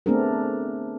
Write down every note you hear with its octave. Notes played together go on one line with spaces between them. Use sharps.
A3 B3 C4 D4 G#4 A#4